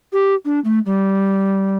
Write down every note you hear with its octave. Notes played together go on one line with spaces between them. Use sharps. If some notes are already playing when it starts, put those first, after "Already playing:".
G4
D4
A3
G3